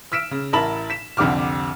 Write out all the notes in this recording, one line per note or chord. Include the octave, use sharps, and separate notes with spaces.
E6 F6 B6 D7 E7
C#3
A1 E4 A#4 A5 B5 F#7
B6 E7
C2 F2 D3 G4 D6 F6